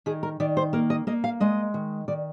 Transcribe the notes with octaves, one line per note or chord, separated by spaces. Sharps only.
D#3 G#4
A#4
D#3 D5
C5
A#3 A#4
D#5
A#3 D#5
F5
G#3 D#5
D#3
D#3 D5